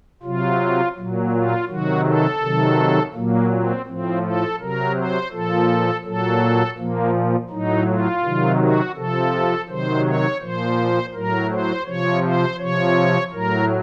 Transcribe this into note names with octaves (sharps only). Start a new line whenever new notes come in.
C3 F#3 F4
A#2 F#3
F4
C3 D#3 F#3 F#4
A4
C3 D#3 F#3
A#2 F#3 A#3
C4
A2 F3 C4
A4
C3 F#3 A#4
C5
A#2 F3 A4
A#2 F#3 A4
A#2 F3 A#3
A2 F#3 D#4
F4
C3 D#3 F#3
F#4
C3 F3 A4
C3 D#3 F#3 C5
C#5
A#2 F3 C5
A2 F#3 A#4
C5
C3 F3 C#5
C5
C3 F3 C#5
A2 F#3 A#4